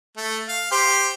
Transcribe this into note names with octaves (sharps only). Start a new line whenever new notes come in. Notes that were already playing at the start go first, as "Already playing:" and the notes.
A3
F5
G4 C5